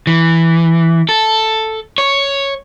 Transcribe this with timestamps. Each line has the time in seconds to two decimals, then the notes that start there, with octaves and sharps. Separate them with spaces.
0.07 E3
1.09 A4
1.98 C#5